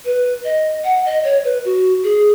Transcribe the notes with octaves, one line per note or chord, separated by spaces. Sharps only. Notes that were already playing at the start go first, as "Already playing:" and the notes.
B4
D#5
F#5
D#5
C#5
B4
F#4
G#4